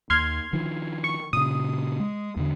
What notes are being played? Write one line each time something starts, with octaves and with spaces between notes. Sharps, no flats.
D#2 C6 F6 G#6
D#3 F3
C#6
A#2 C#3 D#6
G#3
E2 D3